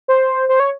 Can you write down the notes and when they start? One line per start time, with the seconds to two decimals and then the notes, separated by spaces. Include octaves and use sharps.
0.08 C5
0.49 C5
0.60 C#5